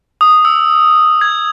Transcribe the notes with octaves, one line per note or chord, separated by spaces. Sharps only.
D#6
E6
G#6